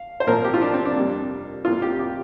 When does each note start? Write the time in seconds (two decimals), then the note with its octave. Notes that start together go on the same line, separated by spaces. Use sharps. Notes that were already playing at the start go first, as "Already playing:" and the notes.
Already playing: F5
0.20 C5
0.27 A#2 F3 C4 A#4
0.44 G4
0.54 F4
0.61 D4
0.74 C4
0.85 D4
0.96 F2 C3 G3 A#3
1.65 F2 C3 A#3 F4
1.82 G4
1.99 G4